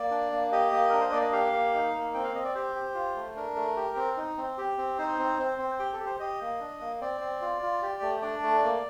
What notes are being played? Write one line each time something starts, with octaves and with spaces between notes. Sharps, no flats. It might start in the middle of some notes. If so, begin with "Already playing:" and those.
Already playing: A#3 D5
D4
A#3
G4 D#5
A#3
D4 A#4
C5
A#3 D5
D#5
G4 F5
A#3
D#4
A#3
C4 G5
F5
C4 D#5
D5
G4 C5
G4
F4
A3
D4 A#4
A3
G4
C4
D#4
C4
G4
C4
D#4 C5
C4
C4
C4
G4 G5
A4
G4
C5
G4 D#5
A#3
D4
A#3
C4 D5
C4
F4
F4
G4
A3
D4 D5
A3
A#3